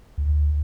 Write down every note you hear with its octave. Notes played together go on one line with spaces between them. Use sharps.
D2